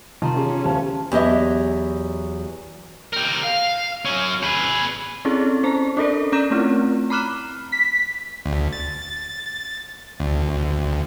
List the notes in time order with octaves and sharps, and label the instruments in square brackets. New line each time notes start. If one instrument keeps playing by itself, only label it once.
[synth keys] C3 [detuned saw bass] D#3 [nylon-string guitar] F4 [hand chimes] A5 A#5 C6
[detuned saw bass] C#4 [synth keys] G4 G#4
[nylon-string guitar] D2 A5 [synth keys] E3 [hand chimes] G4 C5 F5
[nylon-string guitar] E2 F#3 G4 D#5 E5
[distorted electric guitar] G4 A#4
F5
F#3 C#4
G#4 B4
[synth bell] C4 C#4 E4 G#4 A4
C#4 C5 A5 A#5
C#4 D4 A4 A#4 D5
C#4 D5 A#5 G6 A#6 E7
A3 C4 E4 F4
A#5 B5 D6 F6 F#6 E7
[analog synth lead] B6
[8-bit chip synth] D2
A6
D2